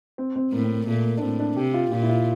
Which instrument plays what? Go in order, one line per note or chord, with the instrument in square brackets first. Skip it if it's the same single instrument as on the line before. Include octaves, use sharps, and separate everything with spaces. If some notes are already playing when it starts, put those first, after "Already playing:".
[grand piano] C4
C4
[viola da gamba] A2 [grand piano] A#3
[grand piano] C4
A#3
[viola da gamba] A#2 [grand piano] A3
[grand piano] A#3
D4
[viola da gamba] A2 [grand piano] C4
[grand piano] D4
[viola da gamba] C3 [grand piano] G4
[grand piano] F4
[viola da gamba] A#2 [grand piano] F4
[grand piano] E4
F4